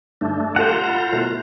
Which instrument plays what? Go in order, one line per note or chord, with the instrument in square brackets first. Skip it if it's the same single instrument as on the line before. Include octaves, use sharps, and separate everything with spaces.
[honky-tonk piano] G2 D3 G6 [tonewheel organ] A3 D4
[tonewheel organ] F4 A#5 [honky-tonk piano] G4 A4 F5 [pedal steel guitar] C5 F#5
[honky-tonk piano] B5 A6
B2 A3 E4